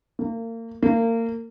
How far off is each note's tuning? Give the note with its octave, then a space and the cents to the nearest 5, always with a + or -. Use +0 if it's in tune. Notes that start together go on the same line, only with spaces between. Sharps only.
A#3 -35
A#3 -30